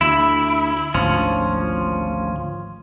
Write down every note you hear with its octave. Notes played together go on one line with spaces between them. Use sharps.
D2 E4
G#1 D2 F3 C#4